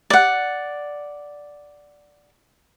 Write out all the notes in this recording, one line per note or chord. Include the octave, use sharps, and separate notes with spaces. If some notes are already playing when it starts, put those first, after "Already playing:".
D5 F#5